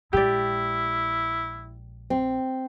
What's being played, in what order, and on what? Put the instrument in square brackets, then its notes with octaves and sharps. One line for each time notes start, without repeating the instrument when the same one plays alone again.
[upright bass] A#1 G#3 [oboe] E4 [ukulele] G4 D5
[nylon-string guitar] C4